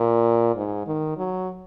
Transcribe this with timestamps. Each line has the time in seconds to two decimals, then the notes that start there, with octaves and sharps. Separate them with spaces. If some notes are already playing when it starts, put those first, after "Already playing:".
Already playing: A#2
0.55 G#2
0.87 D#3
1.17 F#3